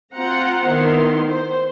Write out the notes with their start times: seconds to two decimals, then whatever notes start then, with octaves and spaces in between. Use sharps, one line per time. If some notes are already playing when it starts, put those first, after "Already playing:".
0.14 C4 F4 C5 F#5 A#5
0.66 D#3 B3 E4 C6
1.27 C5